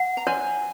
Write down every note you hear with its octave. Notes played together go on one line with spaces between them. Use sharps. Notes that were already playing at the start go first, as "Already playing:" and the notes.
Already playing: F#5
A#5
C#5 G#5